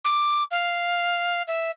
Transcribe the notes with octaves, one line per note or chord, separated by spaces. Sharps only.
D6
F5
E5